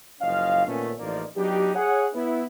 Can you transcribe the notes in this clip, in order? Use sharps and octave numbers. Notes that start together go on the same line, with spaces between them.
F#1 F3 C#4 D#5 F5
A#2 D#3 A3 B3 C#4
A1 F3 A#3 D#4 D5
F#3 B3 D4 D#4 G4
G#4 C#5 F#5
B3 E4